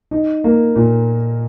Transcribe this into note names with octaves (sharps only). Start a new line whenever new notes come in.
D#4
A#3
A#2